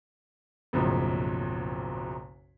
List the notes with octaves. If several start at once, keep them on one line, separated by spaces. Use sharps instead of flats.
F#1 B1 F#2 A2 C#3 F3